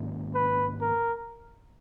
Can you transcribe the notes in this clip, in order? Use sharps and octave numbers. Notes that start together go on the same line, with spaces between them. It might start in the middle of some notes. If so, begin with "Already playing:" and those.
Already playing: G#2 D#3 A#3 C#4
B4
A#4